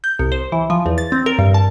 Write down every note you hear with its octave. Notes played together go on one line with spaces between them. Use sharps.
G6
C2
C5
E3
F3
E2
A6
C4
A#4
G2
A5